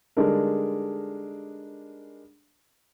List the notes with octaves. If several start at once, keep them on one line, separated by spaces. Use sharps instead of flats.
D3 G3 G#3 D4 D#4 A#4